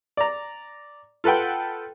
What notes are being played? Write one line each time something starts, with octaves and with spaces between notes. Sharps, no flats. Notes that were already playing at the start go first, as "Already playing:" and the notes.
D5 A#5
F4 A4 B4 F#5 G5